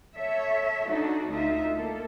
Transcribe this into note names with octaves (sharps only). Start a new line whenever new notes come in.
A4 C#5 E5
D4 D#4 F#4 A4
D2 D#4 F4 E5
A#3 A4